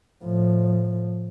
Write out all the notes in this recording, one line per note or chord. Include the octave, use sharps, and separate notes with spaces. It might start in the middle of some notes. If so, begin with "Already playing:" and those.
A2 F3